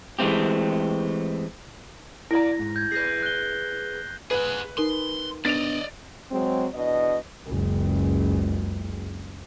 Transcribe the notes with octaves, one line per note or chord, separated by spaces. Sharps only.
E3 G#3 A3 C4 G4
E4 A#4 D5 A#5 A#6
G#2
G6 G#6
G#4 B4 G6 A#6 C7
F#6 G7
G#4 B4 F#5
D#4 A#4 C6
B3 D4 D5 D#5 A6 D7 F7
F#3 G#3 C4
E2 B2 D4 D#5
F#1 C#2